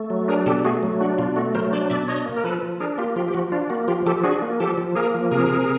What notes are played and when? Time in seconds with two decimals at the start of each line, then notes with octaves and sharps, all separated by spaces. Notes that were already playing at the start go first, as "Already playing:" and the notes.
Already playing: A3
0.10 F#3
0.28 D4 G#4 A#4
0.46 B2 G4 A4
0.65 A3 F#4 G#4
0.83 F#3
1.01 D4 F#4
1.18 B2 F4
1.36 A3 F#4
1.55 F#3 A#4 C5
1.72 D4 C5 D5
1.90 B2 D5 E5
2.08 D4 C#5 D#5
2.26 A#3
2.37 A#4
2.44 F3 A4 B4
2.63 F3
2.80 D4 G#4 A#4
2.98 A#3 F4 G4
3.16 F3 F4 G4
3.28 G4
3.34 F3 F#4
3.52 D4 F4
3.70 A#3 F#4
3.88 F3 F4 G4
4.06 F3 G4 A4
4.23 D4 F#4 G#4
4.42 A#3
4.60 F3 G4 A4
4.78 F3
4.95 A#3 G#4 A#4
5.14 F3
5.31 C3 G#4 A#4
5.50 C3